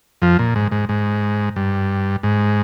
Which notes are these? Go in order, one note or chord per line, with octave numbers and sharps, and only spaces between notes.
F2 F3
A#2
G#2
G#2
G#2
G2
G#2